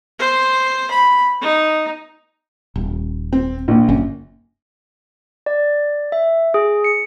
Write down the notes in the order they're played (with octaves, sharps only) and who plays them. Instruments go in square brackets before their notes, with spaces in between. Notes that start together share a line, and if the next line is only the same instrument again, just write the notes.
[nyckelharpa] C5
B5
D#4
[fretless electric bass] D#1
[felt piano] C4
A#1 A#2
[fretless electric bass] F#1 C#4
[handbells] D5
E5
G#4
C#7